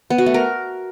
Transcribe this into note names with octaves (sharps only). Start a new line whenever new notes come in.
B3
F#4
A3
A#4